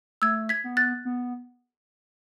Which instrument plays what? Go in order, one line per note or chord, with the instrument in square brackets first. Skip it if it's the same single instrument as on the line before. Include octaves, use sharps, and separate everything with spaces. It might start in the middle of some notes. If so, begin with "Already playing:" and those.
[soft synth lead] A3 [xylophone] E6 G#6
[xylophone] G#6 B6
[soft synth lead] B3
[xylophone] F#6 A6
[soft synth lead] B3